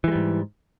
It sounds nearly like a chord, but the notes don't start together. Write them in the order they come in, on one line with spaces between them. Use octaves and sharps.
E3 G#3 G3 G#2